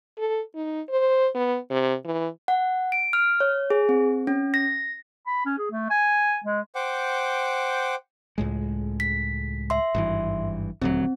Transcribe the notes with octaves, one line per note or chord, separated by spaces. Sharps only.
A4
D#4
C5
B3
C3
E3
F#5
D7
F6
C#5
G#4
C4
C#4
A#6
B5
C#4
G#4
A3
G#5
G#3
C5 F#5 G5 D6
C#2 A2 G#3
B6
E5 C6
G#1 G2 E3
D#1 D2 F#3 C4